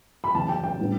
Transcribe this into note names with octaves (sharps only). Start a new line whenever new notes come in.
B5
E2 C#3 F#3 C#4 A5
G5
G5
A2 G3 B3 D4